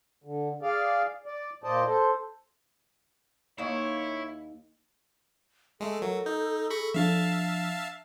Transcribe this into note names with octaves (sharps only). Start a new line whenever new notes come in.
D3
G#4 D5 F5
D5
A#2 C5 D5 D#5 A5
A4 C5
D#2 A#3 D#4 E4 C#5
G#3 A3 A4
F#3 A#4
D#4 G6
G#4 B5 C#6 A#6
F3 D4 E5 F5 A5